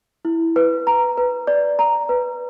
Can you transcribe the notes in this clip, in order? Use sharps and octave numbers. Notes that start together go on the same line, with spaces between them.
E4
B4
A#5
B4
D5
A#5
B4